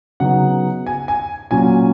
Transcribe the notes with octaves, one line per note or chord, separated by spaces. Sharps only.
C#3 F#3 B3 D#4 F#5
G#5
G#5
A#2 F#3 C#4 G#5